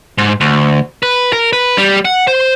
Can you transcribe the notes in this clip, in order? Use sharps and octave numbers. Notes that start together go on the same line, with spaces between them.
G#2
D2
B4
A#4
B4
G3
F#5
C5